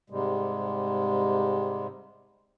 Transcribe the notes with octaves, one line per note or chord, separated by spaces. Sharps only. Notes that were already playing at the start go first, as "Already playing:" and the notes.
G#2 C3 G3 G#3